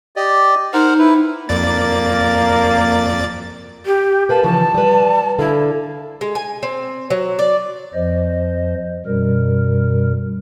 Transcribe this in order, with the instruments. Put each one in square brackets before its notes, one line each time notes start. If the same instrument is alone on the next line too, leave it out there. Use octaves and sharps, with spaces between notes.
[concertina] G4 D5 D#5
[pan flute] D#4 [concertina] A#4 C5 F#5
[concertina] E4 B4
[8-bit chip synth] F2 D5 A6 [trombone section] A#3
[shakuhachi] G4
[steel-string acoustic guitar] A#4 B4 F5 [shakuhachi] A5
[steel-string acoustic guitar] C#3 E3 F3 [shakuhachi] A5
[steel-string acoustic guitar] G3 B4
[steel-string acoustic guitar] D3 A4 F5 [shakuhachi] E4
[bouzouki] G#3
G#5
C4
F#3
D5
[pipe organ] F2 F3 C5 D#5
F#2 B2 G3 A#4